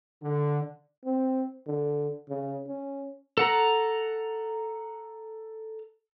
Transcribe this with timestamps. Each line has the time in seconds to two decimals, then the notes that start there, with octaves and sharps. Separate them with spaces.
0.23 D3
1.05 C4
1.66 D3
2.29 C#3
2.68 C#4
3.38 A4 F#5 A#5